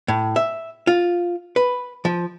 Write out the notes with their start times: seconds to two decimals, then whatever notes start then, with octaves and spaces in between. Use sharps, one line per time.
0.08 A2
0.36 E5
0.87 F4
1.56 B4
2.05 F3